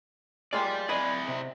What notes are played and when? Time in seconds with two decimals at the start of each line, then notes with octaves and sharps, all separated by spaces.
0.53 G#3 A#3 F4 D5 G5
0.89 E4 G#4 B4 D5 D#5
1.28 C3